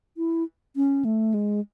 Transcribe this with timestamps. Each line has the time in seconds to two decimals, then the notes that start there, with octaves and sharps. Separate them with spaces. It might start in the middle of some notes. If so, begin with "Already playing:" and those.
0.17 E4
0.76 C#4
1.05 A3
1.34 G#3